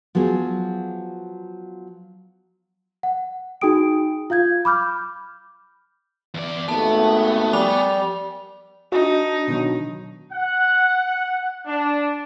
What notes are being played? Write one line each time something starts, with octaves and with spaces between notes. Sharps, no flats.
F3 F#3 B3 G#4
F#5
D#4 F#4 G#4 G5 D#6 D7
F4 F5 G6 G#6
B5 D6 F6 G6
E2 D5
G#1 D#2 A3 B3 A5
F3 G3 D6 F7
D4 D#4 F#4
B2 D#3 F#3
F#5
D4